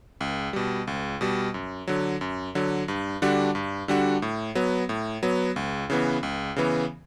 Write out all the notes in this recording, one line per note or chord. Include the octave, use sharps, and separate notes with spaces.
C#2
B2 G3
C#2
B2 G3
F#2
D3 F#3
F#2
D3 F#3
G2
D3 G3 D4 F#4
G2
D3 G3 D4 F#4
A2
F#3 B3
A2
F#3 B3
C#2
C#3 E3 B3
C#2
C#3 E3 B3